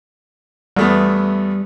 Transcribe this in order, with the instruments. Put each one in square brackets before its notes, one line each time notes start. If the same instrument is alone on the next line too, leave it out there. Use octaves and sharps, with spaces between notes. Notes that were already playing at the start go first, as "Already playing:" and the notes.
[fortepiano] E2 A3 B3 [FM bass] G3